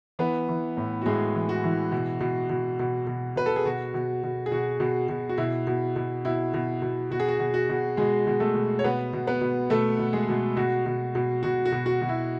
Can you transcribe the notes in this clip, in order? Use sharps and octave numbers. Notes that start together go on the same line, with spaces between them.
E3 B3 B4
E3
A2
F#4
A2 G#3 G#4
E3
F#4
E3
B2
B2
B2
B2
B2
B2 B4
A4
G#4
B2 F#4
B2
B2
G#4
B2 F#4
B2
B2
F#4
B2 E4
B2
B2
B2 E4
B2
B2
B2 F#4
G#4
F#4
B2
F#4
B2
B2 G#3 G#4
B2
A3 A4
B2
C#5
B2 B3 B4
B2
B3 B4
B2
B2 A3 A4
B2
G#3 G#4
B2
B2 F#4
B2
B2
B2 F#4
F#4
B2
F#4
B2
E4